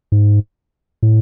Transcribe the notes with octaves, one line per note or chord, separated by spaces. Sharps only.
G#2
A2